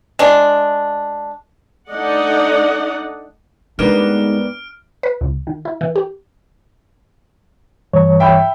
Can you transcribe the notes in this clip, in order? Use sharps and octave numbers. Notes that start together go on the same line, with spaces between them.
G#3 D4
A3 D4 D#4 D5 D#5 F#5
G#2 G3 A#3 B3 D4 F6 D7
B4
C#2
D#3
E4
E3
G4
G2 E3 C#5
E5 G5 B5